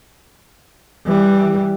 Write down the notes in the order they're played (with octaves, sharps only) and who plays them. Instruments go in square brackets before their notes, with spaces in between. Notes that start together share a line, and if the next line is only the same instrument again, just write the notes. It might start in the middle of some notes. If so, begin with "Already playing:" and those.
[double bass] E3 G3